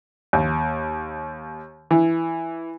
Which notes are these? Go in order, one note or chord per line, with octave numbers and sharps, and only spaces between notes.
D#2
E3